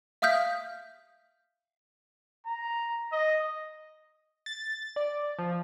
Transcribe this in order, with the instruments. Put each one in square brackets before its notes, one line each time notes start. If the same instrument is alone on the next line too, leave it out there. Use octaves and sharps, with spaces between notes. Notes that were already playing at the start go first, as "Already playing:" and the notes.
[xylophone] E5 F5 D#6 F6 G6 B6
[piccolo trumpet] A#5
D#5
[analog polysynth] A6
D5
F3